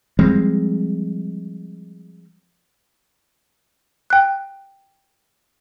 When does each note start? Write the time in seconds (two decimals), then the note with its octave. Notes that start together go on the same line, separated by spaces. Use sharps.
0.19 F3 G3 G#3 C4
4.10 G5 F#6